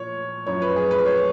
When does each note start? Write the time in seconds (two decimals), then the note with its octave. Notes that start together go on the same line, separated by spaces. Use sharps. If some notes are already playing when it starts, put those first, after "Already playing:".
Already playing: A#2 F3 C#5
0.47 F#2 F3 C#5
0.62 B4
0.76 G#4
0.91 B4
1.06 C#5